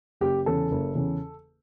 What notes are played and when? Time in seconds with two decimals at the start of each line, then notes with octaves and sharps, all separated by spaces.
0.21 F#1 G4
0.46 E2 C#3 A4
0.71 F#1
0.95 E2 C#3